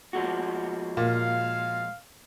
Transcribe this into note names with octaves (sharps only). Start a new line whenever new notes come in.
F3 G#3 F#4
A#2 F5